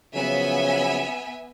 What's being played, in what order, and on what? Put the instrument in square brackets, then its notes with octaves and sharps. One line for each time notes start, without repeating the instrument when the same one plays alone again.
[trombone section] C#3 F3 F#3 [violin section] B3 E5 G#5